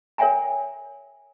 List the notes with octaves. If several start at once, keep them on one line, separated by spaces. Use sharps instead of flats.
A#4 C#5 E5 G5 G#5 A#5